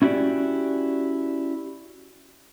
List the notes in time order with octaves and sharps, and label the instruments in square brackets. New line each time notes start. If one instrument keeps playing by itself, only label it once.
[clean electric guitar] C#4 E4 F#4 G4 D5